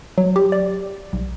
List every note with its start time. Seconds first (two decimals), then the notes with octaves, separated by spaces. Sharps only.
0.18 F#3
0.36 G4
0.52 D5
1.13 B1